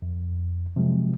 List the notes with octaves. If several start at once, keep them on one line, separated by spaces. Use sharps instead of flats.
F2
C3 F3 F#3 G#3